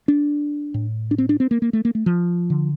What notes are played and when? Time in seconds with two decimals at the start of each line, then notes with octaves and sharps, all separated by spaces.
0.08 D4
0.74 A2
1.11 D4
1.18 C4
1.29 D4
1.40 C4
1.51 A#3
1.62 A#3
1.73 A3
1.85 A#3
1.95 A3
2.06 F3
2.50 D3